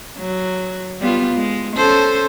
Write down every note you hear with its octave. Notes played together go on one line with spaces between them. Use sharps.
F#3
G3 B3 F4
G#3
C#4 A4 C5